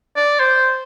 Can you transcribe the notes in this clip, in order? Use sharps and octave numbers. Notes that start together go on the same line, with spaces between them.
D5
C5